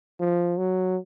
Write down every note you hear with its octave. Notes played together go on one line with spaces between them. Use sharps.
F3
F#3